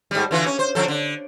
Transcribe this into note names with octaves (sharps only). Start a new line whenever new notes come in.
G#2 G3
D3 E3 F4
C#4
C5
D3 F3 A4
D3